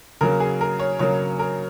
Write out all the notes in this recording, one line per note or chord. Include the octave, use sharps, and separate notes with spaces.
C#3 F#3 A#3 A#4
G#4
A#4
C#5
C#3 F#3 A#3 C#5
A#4